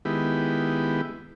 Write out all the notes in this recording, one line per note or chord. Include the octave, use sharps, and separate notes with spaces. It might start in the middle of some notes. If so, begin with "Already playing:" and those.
D#3 G#3 B3 E4 G4